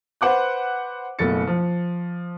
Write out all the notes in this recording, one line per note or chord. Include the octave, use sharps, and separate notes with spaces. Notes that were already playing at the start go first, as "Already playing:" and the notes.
B4 C5 F#5 D6 F#6
F#1 B2 A3 A6 C#7
F3